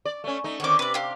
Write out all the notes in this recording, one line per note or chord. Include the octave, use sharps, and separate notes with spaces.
D5
A3 C#4
A3 D#4
D3 D#3 C4 C#5 D6
C3 B4 D5
G4 F5